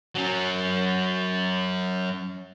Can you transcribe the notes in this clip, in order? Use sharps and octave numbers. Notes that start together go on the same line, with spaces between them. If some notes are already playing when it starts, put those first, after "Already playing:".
F#3 C#4